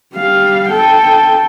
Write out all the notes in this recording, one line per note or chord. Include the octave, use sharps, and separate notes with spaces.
G3 F5
A4 G5